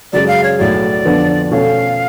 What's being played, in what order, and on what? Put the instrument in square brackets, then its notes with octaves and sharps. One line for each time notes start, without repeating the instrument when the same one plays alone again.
[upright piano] F#2 C#3 G#3 [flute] D5
[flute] F5
C#5
[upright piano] B1 A2 F#3 [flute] D5
[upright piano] F2 D3 F3 B3 F4
[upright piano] B2 A3 C#4 F#4 A4 [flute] F5